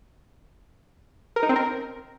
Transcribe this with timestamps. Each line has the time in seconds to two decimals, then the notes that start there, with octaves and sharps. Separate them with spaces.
1.36 A#4
1.43 D#4
1.49 C4
1.56 A#4